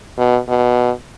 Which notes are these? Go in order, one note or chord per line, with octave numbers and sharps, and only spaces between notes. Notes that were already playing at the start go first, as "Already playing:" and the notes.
B2
B2